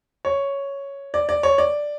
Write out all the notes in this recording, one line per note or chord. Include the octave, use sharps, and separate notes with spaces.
C#5
D5
D5
C#5
D5